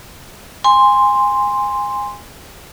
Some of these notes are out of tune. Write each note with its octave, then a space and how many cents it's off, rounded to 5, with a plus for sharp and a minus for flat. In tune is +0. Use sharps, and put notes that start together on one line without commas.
G#5 -20 C6 +0